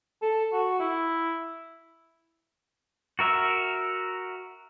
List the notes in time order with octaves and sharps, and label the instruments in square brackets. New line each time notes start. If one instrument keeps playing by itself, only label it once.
[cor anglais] A4
F#4
E4
[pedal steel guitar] F#4 A#4 E5